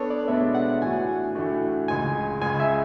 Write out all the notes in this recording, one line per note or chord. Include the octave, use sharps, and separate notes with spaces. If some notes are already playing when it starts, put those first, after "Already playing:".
Already playing: B3 D4 A4 B4 C#5
D5
B2 G#3 B3 D4 A4 E5
F#5
A2 E3 A3 D4 F#4 G#5
A2 E3 A3 D4 F#4
C#2 C#3 G#3 G#5
C#2 C#3 G#3 G#5
E5